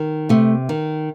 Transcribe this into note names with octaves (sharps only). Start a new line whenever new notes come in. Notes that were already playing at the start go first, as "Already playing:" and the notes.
Already playing: D#3
C3 A3
D#3